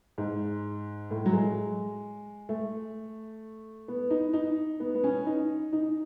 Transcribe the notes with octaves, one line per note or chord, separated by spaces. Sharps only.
G#2
A2
F#3
G#3
A3
B3
D#4
D#4
B3
B3
C#4
D#4
D#4